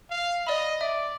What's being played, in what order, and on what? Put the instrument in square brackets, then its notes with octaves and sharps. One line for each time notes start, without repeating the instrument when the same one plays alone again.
[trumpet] F5
[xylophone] D5 B5 [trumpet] D#5
[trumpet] D5 [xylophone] E5